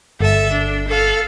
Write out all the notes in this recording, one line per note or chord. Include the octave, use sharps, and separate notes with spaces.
G1 A4 E5
D4
A4 F5